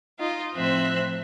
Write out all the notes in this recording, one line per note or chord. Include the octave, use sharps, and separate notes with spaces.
D#4 F4 D#5
A2 F3 C4 C5 E5 F#6